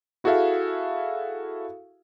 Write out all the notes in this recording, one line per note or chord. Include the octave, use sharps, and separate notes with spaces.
E4 F#4 G#4 A4 E5 F5